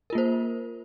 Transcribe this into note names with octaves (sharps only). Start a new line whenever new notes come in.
A#3 F4 A#4 C5